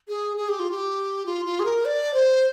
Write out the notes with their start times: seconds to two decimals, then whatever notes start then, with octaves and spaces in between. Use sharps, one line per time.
0.08 G#4
0.37 G#4
0.49 G4
0.59 F4
0.71 G4
1.26 F4
1.45 F4
1.59 G#4
1.65 A#4
1.85 D5
2.14 C5